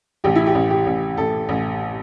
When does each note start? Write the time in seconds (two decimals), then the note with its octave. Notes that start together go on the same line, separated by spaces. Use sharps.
0.24 A1 G4
0.35 E4
0.46 G4
0.55 A1
0.70 G4
0.86 A1
1.17 A1 A4
1.49 A1